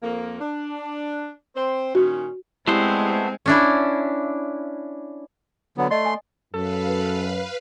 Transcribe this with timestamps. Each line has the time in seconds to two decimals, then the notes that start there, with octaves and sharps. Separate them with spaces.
0.03 F2 A#3
0.40 D4
1.56 C4 C5
1.95 A#2 D#3 C#4 F#4
2.68 G#3 A3 B3 C4 E4 G4 C5 D5
3.46 C#4 D4 E4
5.78 D3 F#3 B3
5.91 A3 D5 D#5 C6
6.05 G#5 D#6
6.54 F#2 A4 B4 F5